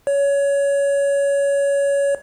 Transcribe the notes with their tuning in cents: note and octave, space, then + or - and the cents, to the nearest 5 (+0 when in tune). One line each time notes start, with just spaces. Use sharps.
C#5 +20